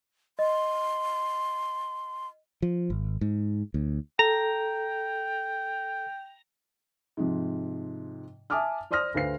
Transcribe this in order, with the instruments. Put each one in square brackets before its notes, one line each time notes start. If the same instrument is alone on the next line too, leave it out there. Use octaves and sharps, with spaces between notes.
[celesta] D#5 [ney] C6
[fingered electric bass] F3
G#1
G#2
D2
[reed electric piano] A4 [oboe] G5 [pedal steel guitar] A#5
[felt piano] G#2 C3 F3
E5 G#5 A5 D6 D#6 F6
C5 D5 C6 D#6 F6 A#6
D2 B4 C5 F5 C7